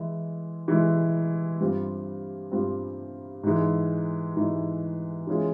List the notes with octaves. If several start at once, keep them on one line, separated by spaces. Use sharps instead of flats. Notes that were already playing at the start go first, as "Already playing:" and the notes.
Already playing: E3 G#3 E4
E3 G#3 E4
G2 G3 C4 F4
G2 G3 C4 F4
G#2 E3 G#3
G#2 E3 G#3
E3 G#3 C#4 F4 G#4